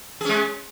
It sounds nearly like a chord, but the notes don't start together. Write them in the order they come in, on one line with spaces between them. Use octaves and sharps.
G#4 C#4 G#3